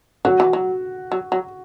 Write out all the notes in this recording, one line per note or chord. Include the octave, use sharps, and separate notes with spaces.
F#3 F#4
E3
F#3
F#3
F#3